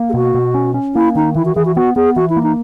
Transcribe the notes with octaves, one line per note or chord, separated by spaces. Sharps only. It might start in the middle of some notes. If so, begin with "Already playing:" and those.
Already playing: A#3
G#4
B2 F#4
B2
C#4
C#4
A#3 E4
D#3 D#4
E3 E4
F#4
E3 G#4
F#4
B3 F#4
B3 G#4
E3 F#4
E4
A#3
D#4